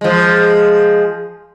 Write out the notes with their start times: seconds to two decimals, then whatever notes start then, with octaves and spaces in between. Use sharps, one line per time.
0.01 F3 G#3